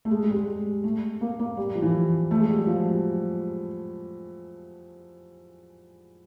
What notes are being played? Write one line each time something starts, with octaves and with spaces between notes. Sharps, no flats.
A3
G#3
G#3
G3
G#3
A3
A#3
A#3
G3
F3
E3
A3
G#3
G3
F#3
F3